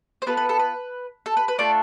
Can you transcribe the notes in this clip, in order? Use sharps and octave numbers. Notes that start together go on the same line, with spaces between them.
C5
B3 F4 A4 B4
B4
A4
B4
A4
B4
B4
A3 D4 F4 A4 D5